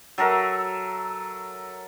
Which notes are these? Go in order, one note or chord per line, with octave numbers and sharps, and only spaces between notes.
F#3 A4 A#4 E5